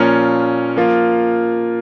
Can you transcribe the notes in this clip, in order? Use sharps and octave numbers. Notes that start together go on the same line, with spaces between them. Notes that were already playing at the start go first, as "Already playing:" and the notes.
Already playing: A#2 F3 C#4 A#4 C#5
F3 A#3 F4